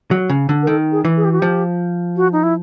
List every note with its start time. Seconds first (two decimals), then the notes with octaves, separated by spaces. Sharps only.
0.11 F#3
0.29 C#3
0.49 D3
0.63 A#4
0.67 D#3 A4
0.92 G#4
1.05 E3
1.17 G#4
1.25 G4
1.32 F#4
1.40 F3 G4
2.17 F#4
2.33 D#4
2.43 E4